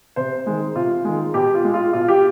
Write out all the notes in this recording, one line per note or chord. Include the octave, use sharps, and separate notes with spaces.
C3 C5
D#3 G#3
C3 F4
D#3 G#3
B2 G4
F4
G#3
F4
B2 F4
G4